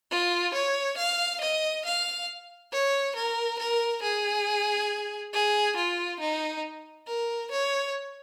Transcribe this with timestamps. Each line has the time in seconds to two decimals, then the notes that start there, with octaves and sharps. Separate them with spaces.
0.11 F4
0.54 C#5
0.98 F5
1.41 D#5
1.85 F5
2.72 C#5
3.16 A#4
3.59 A#4
4.02 G#4
5.34 G#4
5.76 F4
6.20 D#4
7.08 A#4
7.51 C#5